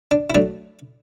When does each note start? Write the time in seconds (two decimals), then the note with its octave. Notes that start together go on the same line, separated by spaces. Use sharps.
0.11 D4
0.30 E4
0.35 F#3 A3 D4